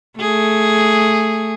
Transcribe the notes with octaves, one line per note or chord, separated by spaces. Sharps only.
A3 G#4